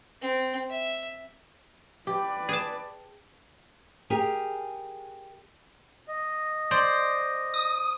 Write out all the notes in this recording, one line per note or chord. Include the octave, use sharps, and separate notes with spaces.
C4
E5
G4 B4 D5
G#4 A5
G4 G#4 A#4 G#5
D#5
C5 D5
D#6